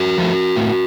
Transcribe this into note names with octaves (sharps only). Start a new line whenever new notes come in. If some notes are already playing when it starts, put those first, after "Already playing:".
Already playing: F#4 A#4
F3 A3
A2